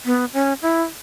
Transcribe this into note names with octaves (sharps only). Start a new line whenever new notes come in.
B3
C#4
E4